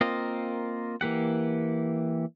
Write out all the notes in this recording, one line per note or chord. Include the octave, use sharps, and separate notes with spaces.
A#3 C4 F4 A#4 D#5
E3 A#3 G4 F#5